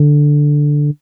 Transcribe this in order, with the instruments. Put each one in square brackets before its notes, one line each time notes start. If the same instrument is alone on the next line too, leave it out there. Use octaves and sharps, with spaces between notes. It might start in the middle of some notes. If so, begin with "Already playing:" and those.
Already playing: [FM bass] D3